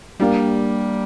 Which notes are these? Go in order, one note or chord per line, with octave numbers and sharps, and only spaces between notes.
G3 A#3 D4 G4